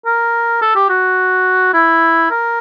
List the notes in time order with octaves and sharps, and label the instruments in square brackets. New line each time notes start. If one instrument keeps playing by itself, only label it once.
[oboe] A#4
A4
G4
F#4
E4
A#4